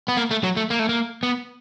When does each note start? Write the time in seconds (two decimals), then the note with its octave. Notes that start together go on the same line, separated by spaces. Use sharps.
0.08 B3
0.17 A#3
0.31 A3
0.43 F#3
0.57 A3
0.70 A#3
0.79 A3
0.89 A#3
1.23 B3